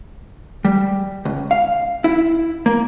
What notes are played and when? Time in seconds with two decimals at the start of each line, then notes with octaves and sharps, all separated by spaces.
0.65 G3
1.25 C#2
1.51 F5
2.04 E4
2.66 A#3